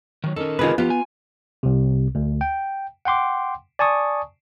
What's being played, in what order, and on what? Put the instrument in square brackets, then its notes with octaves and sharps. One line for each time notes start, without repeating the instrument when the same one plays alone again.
[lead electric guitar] D#3 F#3
[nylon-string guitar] D#3 [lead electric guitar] C#4 A4
[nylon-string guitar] C3 D#3 [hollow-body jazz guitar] F4 G#4 B4
[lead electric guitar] F3 G4 [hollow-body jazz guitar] B3 [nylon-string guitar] F4
[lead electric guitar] G#5
[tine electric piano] C2 C3
D2
G5
F#5 G5 C6 D6
D5 G#5 A5 C#6 D#6